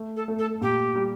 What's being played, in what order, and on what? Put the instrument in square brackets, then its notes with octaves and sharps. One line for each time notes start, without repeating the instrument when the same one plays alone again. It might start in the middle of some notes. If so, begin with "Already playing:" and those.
Already playing: [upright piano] A3
[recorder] A4
[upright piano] A3
[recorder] A4
[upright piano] A#2 [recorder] G4
[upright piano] G3